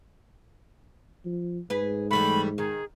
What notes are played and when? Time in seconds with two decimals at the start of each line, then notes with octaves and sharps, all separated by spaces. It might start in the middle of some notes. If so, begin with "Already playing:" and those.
1.25 F3
1.70 G#2 G#4 B4
2.11 E3 G3 A3 B5
2.58 D#3 G#4